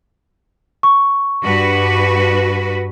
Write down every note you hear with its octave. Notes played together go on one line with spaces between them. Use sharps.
C#6
G2 F#4 B4